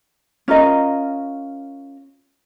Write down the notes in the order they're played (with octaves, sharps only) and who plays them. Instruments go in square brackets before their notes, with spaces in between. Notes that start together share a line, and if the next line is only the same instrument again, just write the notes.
[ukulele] C#4 F4 A#4 D#5